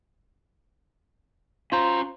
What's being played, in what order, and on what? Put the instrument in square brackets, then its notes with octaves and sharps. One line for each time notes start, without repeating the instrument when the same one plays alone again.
[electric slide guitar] C#4 A#5 [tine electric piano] F4 C5